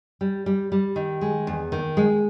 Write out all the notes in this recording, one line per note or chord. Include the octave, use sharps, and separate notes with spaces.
G3
G3
G3
D#3
G#3
E2
D#3
G#3